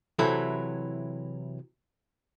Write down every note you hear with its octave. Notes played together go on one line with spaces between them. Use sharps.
C3 E3 F#3 E4 A4